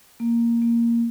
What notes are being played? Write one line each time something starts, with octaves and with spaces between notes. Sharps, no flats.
A#3
A#3